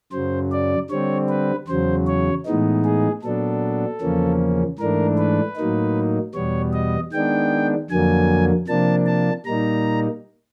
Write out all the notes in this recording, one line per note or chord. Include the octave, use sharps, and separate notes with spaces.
F#2 C#3 F#3 C5
D5
D3 G3 C4 C#5
B4
E2 C#3 F#3 C5
C#5
A2 E3 G#3 B3 D#4
G#4
A#2 F#3 B3 D4 A4
E2 C#3 F3 A#3 C#4
G#2 E3 A3 D4 A#4
B4
A2 F#3 A#3 D#4
E2 B2 G3 B3 C#5
D#5
D#3 G#3 B3 D4 G5
F2 D3 F#3 A#3 G#5
C3 F3 A#3 D4 A5
A5
A#2 G3 A#3 D#4 A#5